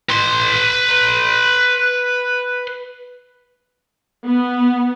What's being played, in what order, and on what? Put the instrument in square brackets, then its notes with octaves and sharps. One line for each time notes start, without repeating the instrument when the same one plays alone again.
[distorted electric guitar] B4 C6
[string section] B3